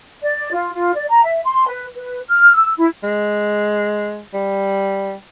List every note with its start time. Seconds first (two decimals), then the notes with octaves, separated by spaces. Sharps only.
0.22 D5
0.52 F4
0.74 F4
0.94 D5
1.09 A#5
1.23 E5
1.45 C6
1.67 B4
1.95 B4
2.28 F6
2.53 E6
2.77 E4
3.03 G#3
4.34 G3